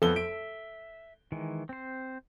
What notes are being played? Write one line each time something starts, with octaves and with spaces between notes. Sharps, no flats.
F2 B3 A4 G7
E5 D7
D#3 E3 G#3
C4 C5